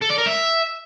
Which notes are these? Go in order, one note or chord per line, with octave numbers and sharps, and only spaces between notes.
A4
D5
A#4
E5